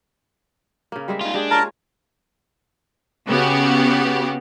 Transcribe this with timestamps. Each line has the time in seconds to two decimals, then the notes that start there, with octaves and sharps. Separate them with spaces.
0.92 C#3 A#3
1.08 G3 G#3 E5
1.21 D#4 F4
1.34 G#3 D4 G4 G#4
1.51 F4 A#4 C#5 A5 A#5
3.28 C#3 B3 F#4 G4